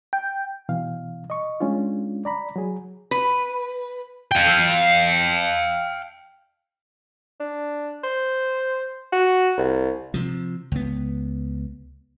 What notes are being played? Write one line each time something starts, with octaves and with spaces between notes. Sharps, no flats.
G5
B2 E3 F5
D#5 C#6
G#3 C#4 D4 F4
D5 A#5 B5
F#3 G#4
B4
F5 G5
D4
C5
F#4
C2
C3 F3
C#2 B3